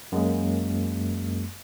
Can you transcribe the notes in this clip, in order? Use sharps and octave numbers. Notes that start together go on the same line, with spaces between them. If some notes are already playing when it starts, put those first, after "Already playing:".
F#2 G#3 A#3